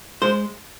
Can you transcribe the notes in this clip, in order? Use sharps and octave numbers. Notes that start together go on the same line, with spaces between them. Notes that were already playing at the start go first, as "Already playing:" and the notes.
G#3 C5